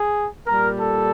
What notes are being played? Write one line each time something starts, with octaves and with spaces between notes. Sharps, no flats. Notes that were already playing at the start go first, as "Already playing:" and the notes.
Already playing: G#4
A#2 G3 A#4
A4